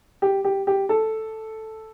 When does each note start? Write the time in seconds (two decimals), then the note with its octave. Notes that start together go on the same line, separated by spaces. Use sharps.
0.22 G4
0.44 G4
0.67 G4
0.89 A4